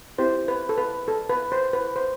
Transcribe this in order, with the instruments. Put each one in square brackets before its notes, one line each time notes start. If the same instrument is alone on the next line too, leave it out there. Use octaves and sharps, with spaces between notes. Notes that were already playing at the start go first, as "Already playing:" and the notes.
[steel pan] C4 E4 G4 C5
B4
A4
B4
A4
B4
C5
B4
C5